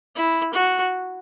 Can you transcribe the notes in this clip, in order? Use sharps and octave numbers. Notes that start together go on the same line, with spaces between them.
E4
F#4